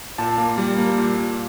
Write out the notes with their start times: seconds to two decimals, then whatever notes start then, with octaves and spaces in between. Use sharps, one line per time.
0.18 A#2 A5
0.38 A#3
0.58 G3
0.78 A#3
0.98 A#2
1.17 A#2